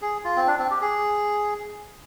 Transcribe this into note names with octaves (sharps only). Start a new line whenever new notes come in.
G#4
F4
C4
D4
C4
G4
G#4